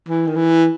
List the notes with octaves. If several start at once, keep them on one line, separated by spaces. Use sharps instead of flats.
E3
D#3
E3